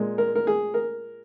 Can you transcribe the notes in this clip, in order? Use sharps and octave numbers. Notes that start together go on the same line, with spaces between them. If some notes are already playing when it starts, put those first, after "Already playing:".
Already playing: A#2 G#3
A#4
A#4
G#4
A#4